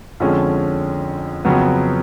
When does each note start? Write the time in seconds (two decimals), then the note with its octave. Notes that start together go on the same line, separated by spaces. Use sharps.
0.20 F2 D3 F3 G#3 C#4
1.45 F2 C#3 F#3 B3